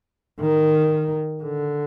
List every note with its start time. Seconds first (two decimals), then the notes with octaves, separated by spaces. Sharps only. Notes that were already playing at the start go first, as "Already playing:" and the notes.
0.40 D#3
1.44 D3